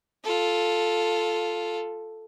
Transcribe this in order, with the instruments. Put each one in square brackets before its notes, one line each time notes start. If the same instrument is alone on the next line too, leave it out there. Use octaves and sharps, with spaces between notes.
[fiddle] F4 A4